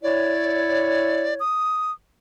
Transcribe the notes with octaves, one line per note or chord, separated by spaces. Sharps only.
E4 C#5 D5
D#6